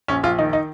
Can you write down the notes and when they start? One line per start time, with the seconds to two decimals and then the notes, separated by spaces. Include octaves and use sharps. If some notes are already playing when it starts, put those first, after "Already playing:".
0.08 A#1 C#4
0.23 A#1 F4
0.38 D#3 D#4
0.53 D#4